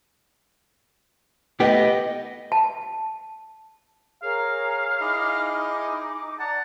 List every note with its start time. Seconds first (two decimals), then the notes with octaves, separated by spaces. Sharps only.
1.60 A3 B3 G4 D#5
2.52 A5
4.23 G#4 A#4 C#5 F5
5.00 D#4 E4 G#4 D#5 D6
6.39 D5 F#5 A5 A#5